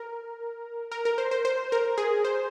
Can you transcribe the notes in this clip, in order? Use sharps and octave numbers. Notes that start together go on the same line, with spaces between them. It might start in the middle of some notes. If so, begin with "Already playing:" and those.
Already playing: A#4
A#4
A#4
C5
C5
C5
A#4
G#4
C5